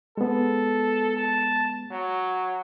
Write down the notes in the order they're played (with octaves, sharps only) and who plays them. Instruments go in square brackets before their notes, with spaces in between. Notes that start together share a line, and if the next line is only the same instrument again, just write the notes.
[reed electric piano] G#3 B3 [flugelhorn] A4
[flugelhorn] A5
F#3